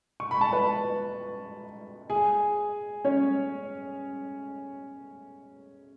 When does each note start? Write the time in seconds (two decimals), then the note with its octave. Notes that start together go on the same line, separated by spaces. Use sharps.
0.20 C#6
0.31 B5
0.41 A5
0.52 B4 B5
2.10 G#4 G#5
3.04 C#4 C#5